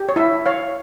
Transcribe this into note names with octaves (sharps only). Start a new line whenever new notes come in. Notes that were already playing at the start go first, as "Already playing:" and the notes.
Already playing: G4
C#5
E4 E5
C#5 F5